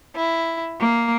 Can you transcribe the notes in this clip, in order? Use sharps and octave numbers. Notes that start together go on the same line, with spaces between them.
E4
A#3